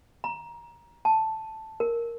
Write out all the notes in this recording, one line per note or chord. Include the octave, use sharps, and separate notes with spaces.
A#5
A5
A#4